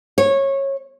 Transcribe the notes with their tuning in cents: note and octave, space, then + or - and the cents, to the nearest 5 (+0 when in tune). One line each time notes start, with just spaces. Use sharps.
C#5 -20